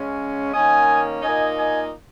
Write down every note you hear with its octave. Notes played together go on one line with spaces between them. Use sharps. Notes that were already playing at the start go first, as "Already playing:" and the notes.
Already playing: C#3 G#3 C#4
D#3 A#3 C#4 D#5 G#5
A#2 A#3 D#4 D#5 G#5
D#5 G#5